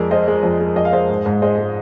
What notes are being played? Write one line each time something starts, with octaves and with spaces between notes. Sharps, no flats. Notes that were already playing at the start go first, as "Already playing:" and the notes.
Already playing: F2 G#3 A#4 D5
G#3 C5 D#5
G#3
F2
G#3
F2 D#5
F5
G#3 C5 D#5
G#2
G#2
G#3 C5 D#5
G#3